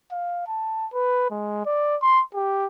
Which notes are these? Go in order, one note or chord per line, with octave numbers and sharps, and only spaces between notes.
F5
A5
B4
G#3
D5
C6
G4